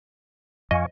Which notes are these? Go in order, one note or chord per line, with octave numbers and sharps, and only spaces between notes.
F2 D#5 F5 G#5 C#6